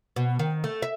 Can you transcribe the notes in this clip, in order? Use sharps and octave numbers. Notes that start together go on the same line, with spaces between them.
B2
D#3
A3
E5